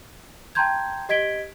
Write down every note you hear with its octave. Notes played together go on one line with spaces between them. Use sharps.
G5 A5 A#5 C6 G6 G#6
G4 D#5 G#6 B6 D7 G7